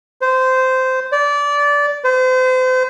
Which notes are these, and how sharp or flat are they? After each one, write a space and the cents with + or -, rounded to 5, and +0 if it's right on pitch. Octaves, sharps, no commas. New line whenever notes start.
C5 -15
D5 -20
C5 -35